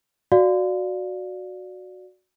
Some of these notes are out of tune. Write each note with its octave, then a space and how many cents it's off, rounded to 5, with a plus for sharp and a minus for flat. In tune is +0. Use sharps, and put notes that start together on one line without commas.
F#4 -5 D5 +0 F5 +0